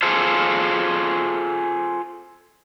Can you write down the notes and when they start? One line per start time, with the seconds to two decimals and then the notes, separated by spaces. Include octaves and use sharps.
0.02 F4 G#4 A4 C5